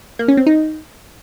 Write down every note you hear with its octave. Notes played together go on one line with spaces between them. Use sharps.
A#3
C#4
C4
D#4